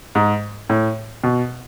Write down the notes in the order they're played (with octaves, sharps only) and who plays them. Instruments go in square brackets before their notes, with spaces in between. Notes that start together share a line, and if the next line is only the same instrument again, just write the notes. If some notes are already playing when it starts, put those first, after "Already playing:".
[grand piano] G#2
A2
B2